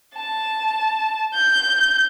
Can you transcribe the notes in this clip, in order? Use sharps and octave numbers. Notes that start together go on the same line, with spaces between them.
A5
G6